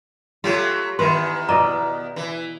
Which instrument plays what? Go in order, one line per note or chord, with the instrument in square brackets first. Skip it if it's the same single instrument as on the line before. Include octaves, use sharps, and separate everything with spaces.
[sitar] F#3 A3 G4 [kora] F4
[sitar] E2 D#3 [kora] B4 E5 [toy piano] C6
[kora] B2 D5 D#5 [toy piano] A#5
[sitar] E3